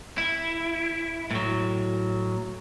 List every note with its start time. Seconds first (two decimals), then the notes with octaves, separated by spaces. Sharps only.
0.18 E4
1.31 A2 F#3